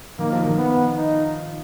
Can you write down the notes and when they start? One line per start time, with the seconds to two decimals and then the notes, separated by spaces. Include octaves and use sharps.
0.19 D#3 A#3
0.32 F3
0.46 D#3
0.58 B3
0.96 D#4